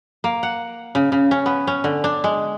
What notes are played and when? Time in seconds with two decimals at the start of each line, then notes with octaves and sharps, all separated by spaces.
0.24 A#3
0.43 F#5
0.95 C#3
1.12 C#3
1.31 C#4
1.46 B3
1.67 C#4
1.84 D3
2.04 D4
2.24 G#3